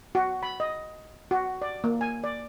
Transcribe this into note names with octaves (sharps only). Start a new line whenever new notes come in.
F#4
B5
D#5
F#4
D5
A#3
G#5
D5